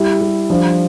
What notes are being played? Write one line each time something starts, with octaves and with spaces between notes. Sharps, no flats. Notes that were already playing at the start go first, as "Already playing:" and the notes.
Already playing: G3 E4
G3
F3 D4